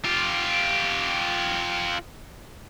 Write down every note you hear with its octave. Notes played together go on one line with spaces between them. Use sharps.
F4 G4